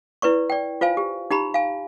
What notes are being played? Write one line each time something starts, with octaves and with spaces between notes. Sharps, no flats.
E4 B4 D5 C#6
D5 G5
F4 C5 F5 G#5
G4
D#4 G4 A#5 B5
F5 G#5